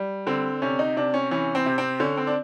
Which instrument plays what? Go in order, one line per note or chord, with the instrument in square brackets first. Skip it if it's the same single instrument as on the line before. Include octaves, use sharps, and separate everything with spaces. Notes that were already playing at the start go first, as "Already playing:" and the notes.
Already playing: [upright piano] G3
D3 C4
C3 C#4
D#4
C3 D4
C#4
E3 C#4
C4
C3
C4
D3 C#4
C4
D4